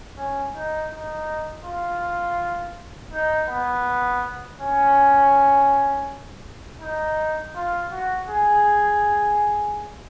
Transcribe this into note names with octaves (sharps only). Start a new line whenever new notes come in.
C#4
D#4
D#4
F4
D#4
B3
C#4
D#4
F4
F#4
G#4